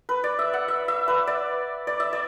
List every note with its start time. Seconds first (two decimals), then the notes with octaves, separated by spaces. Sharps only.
0.09 B4
0.24 D5
0.39 E5
0.53 F#5
0.68 E5
0.88 E5
1.08 B4
1.27 D5
1.87 D5
2.00 E5
2.13 D5